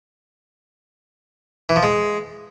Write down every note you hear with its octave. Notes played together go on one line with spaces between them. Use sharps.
E3
F3
G#3